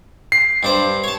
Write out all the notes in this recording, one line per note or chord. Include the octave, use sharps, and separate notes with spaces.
C7
G2 D4 C5
C#5 A5